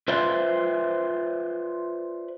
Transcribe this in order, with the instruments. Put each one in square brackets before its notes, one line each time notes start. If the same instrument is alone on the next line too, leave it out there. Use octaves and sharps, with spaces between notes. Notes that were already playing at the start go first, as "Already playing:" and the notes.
[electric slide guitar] F4 B4 C5 D5 E5